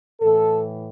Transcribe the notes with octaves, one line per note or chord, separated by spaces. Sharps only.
A2 E3 A4